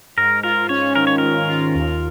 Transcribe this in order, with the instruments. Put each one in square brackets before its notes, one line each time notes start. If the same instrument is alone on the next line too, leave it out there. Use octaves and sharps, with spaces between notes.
[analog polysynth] G#2 [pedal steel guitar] A#4
[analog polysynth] F4 [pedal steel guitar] A#4
[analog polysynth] C#4 [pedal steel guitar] C#5
[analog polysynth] D#3 [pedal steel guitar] A#4
[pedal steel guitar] C#5
[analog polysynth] G#2 [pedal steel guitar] A#4
[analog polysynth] F4
D#2